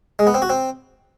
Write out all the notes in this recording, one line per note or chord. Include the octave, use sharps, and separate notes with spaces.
G#3
B3
C4
F#4
C4